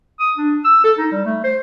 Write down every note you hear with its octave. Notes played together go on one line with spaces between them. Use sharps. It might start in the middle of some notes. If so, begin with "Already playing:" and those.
D#6
D4
E6
A4
D#4
G3
A3
C5